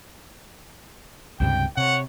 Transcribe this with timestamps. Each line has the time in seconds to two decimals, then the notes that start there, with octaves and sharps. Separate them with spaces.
1.40 C#2 G2 C3 G5
1.77 C3 C#5 F#5